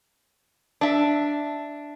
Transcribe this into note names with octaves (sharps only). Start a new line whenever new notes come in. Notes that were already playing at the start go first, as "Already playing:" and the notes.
D4 E5